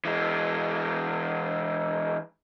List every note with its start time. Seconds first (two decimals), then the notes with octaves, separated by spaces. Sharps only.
0.05 E3 G#3